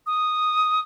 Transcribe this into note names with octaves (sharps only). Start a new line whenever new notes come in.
D#6